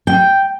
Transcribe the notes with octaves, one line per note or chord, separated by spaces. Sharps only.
G5